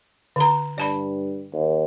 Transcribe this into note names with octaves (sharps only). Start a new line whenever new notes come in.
D3 A#5
G2 D5 A5 B5
D#2